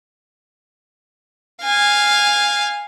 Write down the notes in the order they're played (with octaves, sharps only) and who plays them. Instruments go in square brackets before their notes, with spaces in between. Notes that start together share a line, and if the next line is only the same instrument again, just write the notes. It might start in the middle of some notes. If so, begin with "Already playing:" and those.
[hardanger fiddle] F5 G#5